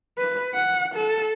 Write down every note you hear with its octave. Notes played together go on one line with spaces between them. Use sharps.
B4
F#5
A4